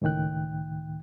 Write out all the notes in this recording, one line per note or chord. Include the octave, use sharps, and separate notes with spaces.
C#2 A2 D#3 G5 F#6